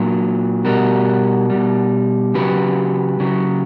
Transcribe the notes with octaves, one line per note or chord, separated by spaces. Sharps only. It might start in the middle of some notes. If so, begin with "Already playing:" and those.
Already playing: A#2 F#3
B2 G3 F#4 A#4
B2 G3
C#3 F#3 G4 B4
C#3 F#3